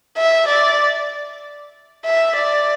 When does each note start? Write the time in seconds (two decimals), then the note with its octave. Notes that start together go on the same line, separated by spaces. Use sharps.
0.18 E5
0.49 D5
2.05 E5
2.36 D5